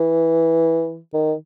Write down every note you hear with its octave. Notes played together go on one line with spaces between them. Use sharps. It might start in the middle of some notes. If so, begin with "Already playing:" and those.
Already playing: E3
D#3